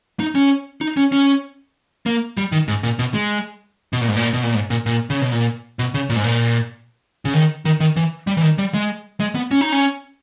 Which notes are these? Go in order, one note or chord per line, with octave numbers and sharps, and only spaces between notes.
D#4
C#4
D#4
C#4
C#4
A#3
G3
D#3
G#2
A#2
B2
G#3
B2
A#2
G#2
A#2
B2
A#2
G#2
A#2
A#2
C#3
B2
A#2
B2
C#3
A#2
G#2
A#2
C#3
D#3
D#3
D#3
E3
G3
E3
D#3
G3
G#3
G#3
B3
C#4
D#4
C#4